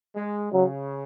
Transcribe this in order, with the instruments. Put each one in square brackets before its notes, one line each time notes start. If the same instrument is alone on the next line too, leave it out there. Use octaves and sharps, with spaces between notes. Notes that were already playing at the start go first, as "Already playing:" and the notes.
[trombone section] G#3
[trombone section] C#3 [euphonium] F#3